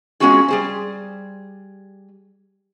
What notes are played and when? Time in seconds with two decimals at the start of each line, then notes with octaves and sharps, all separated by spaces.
0.20 G#3 B3 C#4 F4 F#4 G#4
0.48 G3 G#4 C5